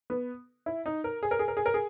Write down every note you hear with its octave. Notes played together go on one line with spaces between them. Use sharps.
B3
E4
D#4
A#4
G#4
A#4
G#4
A#4
G#4
A#4
G#4